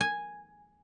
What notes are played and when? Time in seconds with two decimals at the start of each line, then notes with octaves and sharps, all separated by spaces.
0.01 G#5